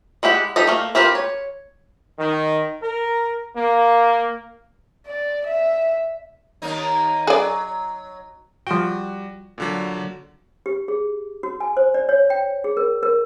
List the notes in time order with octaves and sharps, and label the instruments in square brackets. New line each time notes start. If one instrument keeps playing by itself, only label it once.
[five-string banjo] G#3 E4 G4 F#5
D#4 G4 A4 D#5
A3 A#3
C4 F4 G4 A#4 B4
C#5
[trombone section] D#3
A#4
A#3
[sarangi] D5
E5
[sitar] D#2 A#3 D#4
[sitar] F#3 [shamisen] G#4 D5
[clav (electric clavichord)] F3 G5 [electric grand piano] G3 F#4
[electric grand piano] A#2 D3 F#3
[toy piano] G4
G#4
F#4
G#5
C5
D5
C#5
G5
G#4
A#4
A#4